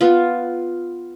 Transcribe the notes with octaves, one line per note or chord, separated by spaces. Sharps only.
B3 F4